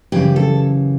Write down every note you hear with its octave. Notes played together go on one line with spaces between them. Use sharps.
F#2 C#3 E3 G4
A4